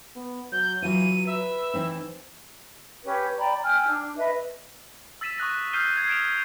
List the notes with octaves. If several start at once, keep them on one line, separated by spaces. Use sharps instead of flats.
B3
F#3 G6
E3 F#3 F4 D#7
B4 E5
E3 C4 D#4
C#4 G4 B4
D5 G5 A#5 B5
G5 G#5 E6 F6
D4
B4 D#5 E5
E6 A6 B6 D#7 E7
C#6 D#6 F#6 A#6
D#6 F6 G6 C7 D#7 G7
F#6 G#6 C7
G#6 D7 E7 F7